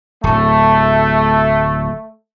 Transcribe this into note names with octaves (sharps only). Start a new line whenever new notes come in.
D1 A3